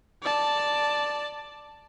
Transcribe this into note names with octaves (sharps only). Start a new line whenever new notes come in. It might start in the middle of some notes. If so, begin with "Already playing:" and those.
D5 A5